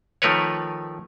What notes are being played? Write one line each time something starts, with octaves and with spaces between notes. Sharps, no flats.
D#3 F3 A3 A#4 B4 C#5